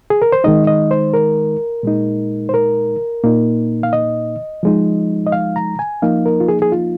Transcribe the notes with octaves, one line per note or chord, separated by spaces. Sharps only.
G#4
A#4
C5
D#3 G#3 D#4 D#5
D#5
C5
A#4
A#2 G#3 D#4
C5
A#4
A#2 A#3 D#4
F5
D#5
F3 G#3 D#4
D#5
F5
A#5
G#5
F3 A#3 D#4 F5
A#4
F4
G#4
G#4
F4